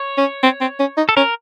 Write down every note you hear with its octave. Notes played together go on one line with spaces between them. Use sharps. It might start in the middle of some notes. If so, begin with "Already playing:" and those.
Already playing: C#5
C#4
C4
C4
C#4
D#4
A4
C#4 A#4